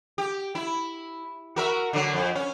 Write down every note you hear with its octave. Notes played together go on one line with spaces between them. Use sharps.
G4
E4
F#4 A#4 E5
D3 F#3
F2
C#4